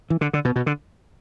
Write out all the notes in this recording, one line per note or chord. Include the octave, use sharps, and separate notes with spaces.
E3
D3
D3
B2
B2
D3